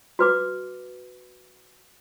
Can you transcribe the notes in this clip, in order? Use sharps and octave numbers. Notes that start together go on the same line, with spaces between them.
F#4 B4 D6